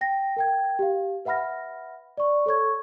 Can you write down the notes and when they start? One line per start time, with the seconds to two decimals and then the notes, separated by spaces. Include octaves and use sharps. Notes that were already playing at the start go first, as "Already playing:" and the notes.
0.01 G5 A#6
0.36 A#4 G5 G#6
0.79 G4 F5
1.25 B4 E5 F#5 B5 F6 A#6
2.17 D5 C#6
2.46 A4 C#5 C#6 G#6